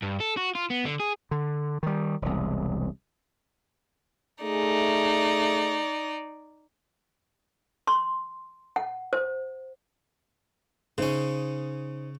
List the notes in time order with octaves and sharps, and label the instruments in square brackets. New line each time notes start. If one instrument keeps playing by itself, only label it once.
[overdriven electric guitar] G2
A4
F#4
F4
B3
D3
G#4
[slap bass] D3
D#3 G3
E1 C2
[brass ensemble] A3 G#4 [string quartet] D#4 D5
[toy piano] C6
F#5
C5
[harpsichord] C#3 C#4 [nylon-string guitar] D#4 C5